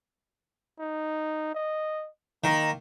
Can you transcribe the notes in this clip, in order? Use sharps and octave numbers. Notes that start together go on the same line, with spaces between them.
D#4
D#5
D#3 A#3 A#5